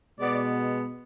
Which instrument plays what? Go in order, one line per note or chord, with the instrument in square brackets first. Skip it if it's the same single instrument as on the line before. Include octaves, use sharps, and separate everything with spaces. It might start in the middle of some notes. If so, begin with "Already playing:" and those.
[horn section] B2 G#3 B3 D5